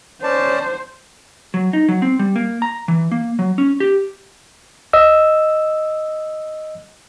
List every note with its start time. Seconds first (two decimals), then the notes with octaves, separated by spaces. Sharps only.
0.23 C#4 C5 D5 A5
1.54 F#3
1.73 D#4
1.89 F#3
2.02 C4
2.19 G3
2.36 A#3
2.62 A#5
2.88 E3
3.12 A#3
3.39 F#3
3.58 C#4
3.80 G4
4.93 D#5 E6